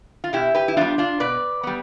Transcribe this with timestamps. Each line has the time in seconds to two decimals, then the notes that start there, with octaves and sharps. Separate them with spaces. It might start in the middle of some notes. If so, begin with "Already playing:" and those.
0.24 F4
0.33 B2 E4 G4
0.54 G4 B4
0.68 E4
0.77 G3 B3 D4 F4
0.98 D4 F4
1.20 B2 B4 D5
1.63 G3 B3